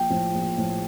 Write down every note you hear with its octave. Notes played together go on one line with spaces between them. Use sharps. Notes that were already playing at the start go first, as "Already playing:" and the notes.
Already playing: A#1 G5
A2 F3
A#1
A2 F3